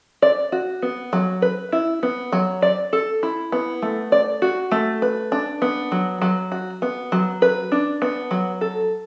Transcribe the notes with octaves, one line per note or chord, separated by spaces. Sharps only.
D5
F#4
B3
F#3
B4
E4
B3
F#3
D5
A4
E4
B3
A3
D5
F#4
A3
B4
D4
B3
F#3
F#3
F#4
B3
F#3
B4
D4
B3
F#3
A4